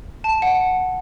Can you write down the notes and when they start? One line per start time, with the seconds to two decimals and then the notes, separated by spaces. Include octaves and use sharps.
0.24 A5
0.42 F#5